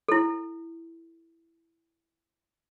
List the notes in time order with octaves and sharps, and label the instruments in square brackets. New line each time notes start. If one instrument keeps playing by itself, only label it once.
[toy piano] E4 A4